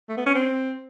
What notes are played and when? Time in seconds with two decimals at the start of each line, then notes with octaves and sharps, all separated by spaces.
0.09 A3
0.18 B3
0.26 C#4
0.35 C4